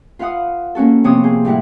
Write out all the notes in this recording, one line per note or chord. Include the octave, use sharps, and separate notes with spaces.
F4 B4 F5 F#5 D#6
A#3 C#4 F#4 A4
C3 F3 A#3 B3 C#5 D#6
G#4 C5
A2 G3 E4 F#5